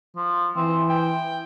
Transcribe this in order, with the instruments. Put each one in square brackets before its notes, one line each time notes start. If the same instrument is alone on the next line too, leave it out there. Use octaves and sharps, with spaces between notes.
[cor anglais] F3
[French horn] E3 [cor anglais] C4
[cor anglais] G5